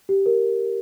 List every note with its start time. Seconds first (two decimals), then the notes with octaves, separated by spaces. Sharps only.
0.09 G4
0.26 A#4